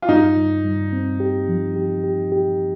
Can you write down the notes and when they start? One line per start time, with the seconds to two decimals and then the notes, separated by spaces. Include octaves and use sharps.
0.02 F4
0.09 G2 D#4
0.37 G2
0.65 G2
0.93 C4
1.20 G4
1.48 F3
1.76 G4
2.04 G4
2.32 G4